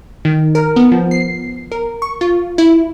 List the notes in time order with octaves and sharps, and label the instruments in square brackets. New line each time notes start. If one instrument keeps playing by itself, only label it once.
[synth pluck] D#3
A#4
B3
F3
C7
A#4
C#6
F4
E4